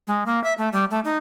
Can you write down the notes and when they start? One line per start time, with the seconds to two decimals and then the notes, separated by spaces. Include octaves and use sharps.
0.07 G#3
0.26 A#3
0.44 E5
0.58 A3
0.73 G3
0.91 A3
1.05 D#4